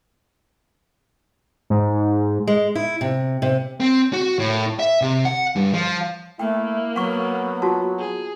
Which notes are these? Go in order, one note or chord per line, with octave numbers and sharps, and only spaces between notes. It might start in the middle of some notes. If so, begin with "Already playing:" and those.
G#2
G#3
E4
C3
C3
C4
F#4
A2
E5
C3
F#5
G2
F3
A3 A#3 E4 G5
F#3 B3 F#5 C#6
F4 F#4 A5
G#4